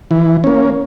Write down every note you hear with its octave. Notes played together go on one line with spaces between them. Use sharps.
E3
A#3 C#4